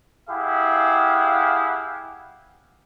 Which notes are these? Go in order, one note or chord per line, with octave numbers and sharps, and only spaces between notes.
E4 G4 G#4 F5 F#5